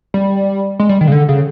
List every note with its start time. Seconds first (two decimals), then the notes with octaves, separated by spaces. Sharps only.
0.14 G3
0.79 G#3
0.89 G3
1.01 D#3
1.08 C#3
1.12 D3
1.29 C#3